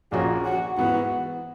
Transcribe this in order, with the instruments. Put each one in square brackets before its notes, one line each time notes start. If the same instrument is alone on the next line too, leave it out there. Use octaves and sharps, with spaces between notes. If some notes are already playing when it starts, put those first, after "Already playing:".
[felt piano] A#1 A#2 A#3 C#4 F#4 [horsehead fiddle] G#4
[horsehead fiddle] F#4
[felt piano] G#2 E3 B3 E4 [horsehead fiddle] F#4